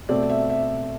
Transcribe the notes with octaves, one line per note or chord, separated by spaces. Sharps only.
B2 A3 C4 D5
E5
E5